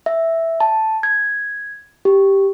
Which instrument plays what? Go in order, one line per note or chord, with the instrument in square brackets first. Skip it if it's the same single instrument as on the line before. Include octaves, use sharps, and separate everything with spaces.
[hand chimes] E5
A5
G#6
G4